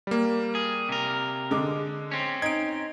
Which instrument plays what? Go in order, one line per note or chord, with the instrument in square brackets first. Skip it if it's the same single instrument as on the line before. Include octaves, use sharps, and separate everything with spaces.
[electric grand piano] G3 A#3
[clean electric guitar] G#4
C3 A#4
[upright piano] D3 G#3 D6
[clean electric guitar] C4 C#4
[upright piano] D#4 [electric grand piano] G#6 D7